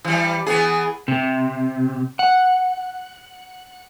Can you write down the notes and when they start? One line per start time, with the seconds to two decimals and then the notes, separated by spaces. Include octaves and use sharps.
0.05 E3 G3
0.46 E3 B3 G#4
1.08 C3
2.19 F#5